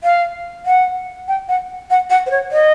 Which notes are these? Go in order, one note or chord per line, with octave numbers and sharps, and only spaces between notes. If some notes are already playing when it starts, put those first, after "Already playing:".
F5
F#5
G5
F#5
F#5
F#5
C5
C#5
D#5